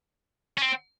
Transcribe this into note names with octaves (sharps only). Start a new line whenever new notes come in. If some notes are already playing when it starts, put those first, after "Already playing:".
C#4
C4